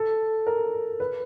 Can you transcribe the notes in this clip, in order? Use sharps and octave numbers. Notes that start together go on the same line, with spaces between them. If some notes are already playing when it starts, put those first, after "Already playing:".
Already playing: A4
A#4
B4